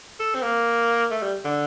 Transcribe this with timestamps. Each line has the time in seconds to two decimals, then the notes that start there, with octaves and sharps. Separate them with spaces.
0.20 A4
0.35 C4
0.43 A#3
1.11 A3
1.22 G3
1.45 D3